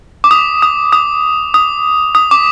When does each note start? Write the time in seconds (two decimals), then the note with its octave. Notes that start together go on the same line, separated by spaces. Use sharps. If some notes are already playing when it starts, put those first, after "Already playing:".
0.24 D6
0.31 D#6
0.62 D#6
0.93 D#6
1.54 D#6
2.15 D#6
2.31 D6